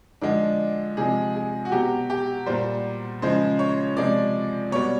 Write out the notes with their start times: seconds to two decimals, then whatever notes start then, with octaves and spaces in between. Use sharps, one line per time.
0.21 D3 F3 G#3 D4
0.97 C3 F3 G#3 G#4
1.35 G#4
1.65 F#4
1.72 B2 F#3 G4
2.10 G4
2.46 A#2 G3 C5
3.22 C#3 F3 G#3 C5
3.59 C#5
3.97 C3 F3 G#3 D5
4.71 B2 G3 C#5